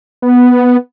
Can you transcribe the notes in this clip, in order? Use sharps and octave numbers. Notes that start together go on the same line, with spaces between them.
B3